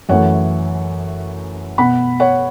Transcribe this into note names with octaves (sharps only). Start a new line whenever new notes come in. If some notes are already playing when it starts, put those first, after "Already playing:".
F#2 E3 A3 C#5 F#5
B2 B3 F#5 B5
C#5 F#5